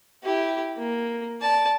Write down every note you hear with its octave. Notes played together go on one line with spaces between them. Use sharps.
E4 G4
A#3
D5 A5